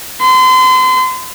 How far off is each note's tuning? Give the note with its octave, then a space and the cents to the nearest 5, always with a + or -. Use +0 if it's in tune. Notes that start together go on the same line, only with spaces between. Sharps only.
C6 -35